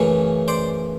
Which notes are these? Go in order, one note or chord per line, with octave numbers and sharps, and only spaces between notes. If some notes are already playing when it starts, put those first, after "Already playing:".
Already playing: F#2 C#3 E3 A3
C5 D5